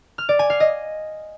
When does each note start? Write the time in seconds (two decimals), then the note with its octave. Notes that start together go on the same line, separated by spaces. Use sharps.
0.18 F6
0.29 D5
0.39 G#5
0.50 F5
0.60 D#5